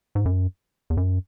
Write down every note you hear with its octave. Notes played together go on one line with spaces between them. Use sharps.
G#2
F#2
E2
F#2